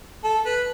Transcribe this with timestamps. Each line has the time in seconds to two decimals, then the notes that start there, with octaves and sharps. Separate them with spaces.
0.24 A4
0.46 B4